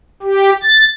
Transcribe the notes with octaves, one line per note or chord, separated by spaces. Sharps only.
G4
A6